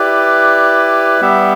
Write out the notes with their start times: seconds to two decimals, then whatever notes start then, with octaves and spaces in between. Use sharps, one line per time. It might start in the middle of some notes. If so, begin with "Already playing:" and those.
Already playing: E4 G4 B4 D5
1.21 G3 B3 G4 E5